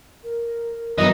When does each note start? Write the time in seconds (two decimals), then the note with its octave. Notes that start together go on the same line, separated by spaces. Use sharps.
0.23 A#4
0.98 G2 E3 F#3 B3 D#4 D#5